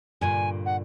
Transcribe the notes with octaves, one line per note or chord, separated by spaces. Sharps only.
G2 A#2 D3 G#5
F#5